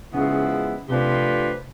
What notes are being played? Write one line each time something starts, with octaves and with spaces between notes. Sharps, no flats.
C#3 F3 G#3 B3 E4
C3 F3 A3 D4 G4 B4